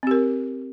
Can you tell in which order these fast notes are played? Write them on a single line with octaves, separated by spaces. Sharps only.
C4 G4 A#4